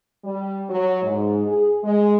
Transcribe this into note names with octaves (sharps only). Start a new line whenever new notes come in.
G3
F#3
G#2
G#4
G#3